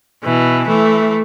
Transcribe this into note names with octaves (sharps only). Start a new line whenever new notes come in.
B2 E3
E3 A3